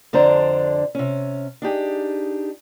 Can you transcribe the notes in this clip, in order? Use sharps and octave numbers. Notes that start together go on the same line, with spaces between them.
F2 D3 D4 C5 A#5
C3 C#4
D4 D#4 G4 G#4